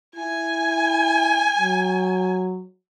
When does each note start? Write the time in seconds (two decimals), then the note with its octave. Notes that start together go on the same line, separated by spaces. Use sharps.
0.16 E4 G#5
1.58 F#3